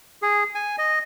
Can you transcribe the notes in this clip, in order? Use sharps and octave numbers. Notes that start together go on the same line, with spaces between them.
G#4
G#5
D#5